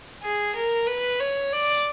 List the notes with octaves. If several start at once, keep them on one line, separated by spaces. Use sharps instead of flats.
G#4
A#4
B4
C#5
D5